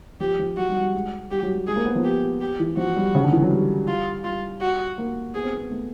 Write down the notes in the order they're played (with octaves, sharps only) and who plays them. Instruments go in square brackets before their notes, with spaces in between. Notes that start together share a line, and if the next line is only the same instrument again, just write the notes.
[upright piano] F3 [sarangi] G4
[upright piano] F3
[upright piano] F#3 [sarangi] F#4
[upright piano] G3
G3
G#3
[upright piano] G3 [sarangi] G4
[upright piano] F#3
G3
[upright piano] G#3 [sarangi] G#4
[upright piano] A#3
B3
F3
[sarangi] G4
G4
[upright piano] E3
[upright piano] F3 [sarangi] F#4
[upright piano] G3
C#3
D3
E3
F#3
G3
[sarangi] F4
[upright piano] G3 [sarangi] F4
[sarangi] F#4
[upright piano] A#3
[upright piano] B3 [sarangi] G#4
[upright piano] C4
B3
A3